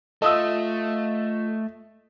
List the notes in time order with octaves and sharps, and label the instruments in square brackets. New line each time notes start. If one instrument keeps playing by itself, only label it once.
[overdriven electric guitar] A3 [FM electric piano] F4 A4 [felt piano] D#5 D#6 E6